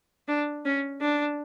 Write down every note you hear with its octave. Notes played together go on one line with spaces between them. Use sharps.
D4
C#4
D4